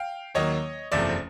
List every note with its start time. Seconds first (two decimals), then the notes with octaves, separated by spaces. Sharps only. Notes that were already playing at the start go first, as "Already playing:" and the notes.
Already playing: F5 G5
0.35 D#2 D#3 F#3 A#3 C#5 D#5
0.92 F#1 E2 C3 F3 A3 D5 E5